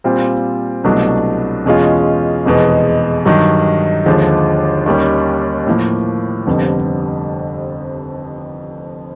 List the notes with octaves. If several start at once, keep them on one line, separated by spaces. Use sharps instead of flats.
A#2 G3 C4 F4
C2 B2 F#3 A3 D4
E2 B2 G#3 C#4 F4
F1 E2 B2 G#3 B3
G2 D#3 F#3
D#2 D3 F3 G#3
D#2 D#3 G3 A#3 C#4
A2 F3 A#3
F1 F2 D3 G3 B3